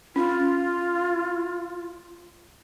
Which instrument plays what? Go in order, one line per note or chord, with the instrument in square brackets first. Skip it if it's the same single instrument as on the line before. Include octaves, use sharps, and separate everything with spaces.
[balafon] C#4 [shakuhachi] F4